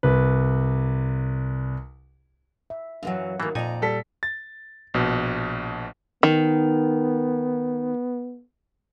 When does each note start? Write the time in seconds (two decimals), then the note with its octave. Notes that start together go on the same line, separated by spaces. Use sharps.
0.03 C2 B4
2.70 E5
3.03 F#2 E3 F#3 F5 F#5
3.40 D#3 E3 F#3 A3 A#3
3.55 F2 A#2 D#4 D5 G#5 A#5
3.82 G3 A4 B6
4.23 A6
4.94 A#1 B2
6.23 D#3 B3